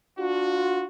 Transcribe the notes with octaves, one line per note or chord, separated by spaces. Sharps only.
D4 F4 F#4